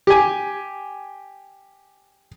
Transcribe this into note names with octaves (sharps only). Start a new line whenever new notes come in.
G4 G#5